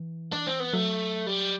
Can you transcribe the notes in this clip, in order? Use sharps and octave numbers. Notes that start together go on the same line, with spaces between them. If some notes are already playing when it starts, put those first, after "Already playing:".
Already playing: E3
D4
C4
B3
F#3 A3
G3